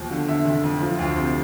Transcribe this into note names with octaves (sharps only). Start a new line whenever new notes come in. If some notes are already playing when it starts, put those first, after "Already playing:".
Already playing: D#2 B2 F3
D3
D3 E5
F1
F2
F3
D2
C3